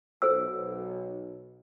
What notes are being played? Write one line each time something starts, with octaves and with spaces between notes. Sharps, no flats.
B1 A4 C5 E6